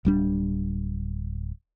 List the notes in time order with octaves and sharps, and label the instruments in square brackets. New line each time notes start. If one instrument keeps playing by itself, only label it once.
[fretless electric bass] D1 G3 D4